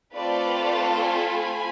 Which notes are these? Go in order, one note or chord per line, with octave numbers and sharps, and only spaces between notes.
A3 C4 F4 A4 B4 D5
G#5 B5